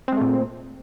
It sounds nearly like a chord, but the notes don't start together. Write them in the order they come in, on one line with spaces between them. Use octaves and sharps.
C4 G#3 A3 A#2